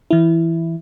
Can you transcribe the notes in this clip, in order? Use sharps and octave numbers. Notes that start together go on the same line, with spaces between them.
E3 E4